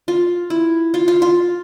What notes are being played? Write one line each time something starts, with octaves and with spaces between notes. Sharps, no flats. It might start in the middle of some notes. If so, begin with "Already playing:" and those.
F4
E4
F4
F4
F4